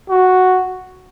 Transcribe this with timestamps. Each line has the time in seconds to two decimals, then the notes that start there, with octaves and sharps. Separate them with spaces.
0.09 F#4